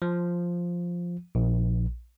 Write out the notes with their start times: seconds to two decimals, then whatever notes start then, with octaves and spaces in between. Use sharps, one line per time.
0.02 F3
1.35 A#1